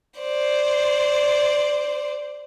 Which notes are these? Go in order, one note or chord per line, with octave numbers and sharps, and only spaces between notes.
C5 D5